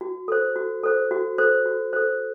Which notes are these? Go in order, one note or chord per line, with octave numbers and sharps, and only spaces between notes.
F#4
A4 C5
F#4
A4 C5
F#4
A4 C5
F#4
A4 C5